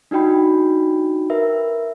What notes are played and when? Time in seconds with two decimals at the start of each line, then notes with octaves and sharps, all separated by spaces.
0.11 D4 D#4 F#4 G5 B5
1.30 A#4 B4 E5